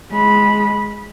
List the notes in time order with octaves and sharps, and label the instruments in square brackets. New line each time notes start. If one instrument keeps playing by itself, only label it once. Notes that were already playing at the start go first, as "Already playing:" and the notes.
[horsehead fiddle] G#3 B5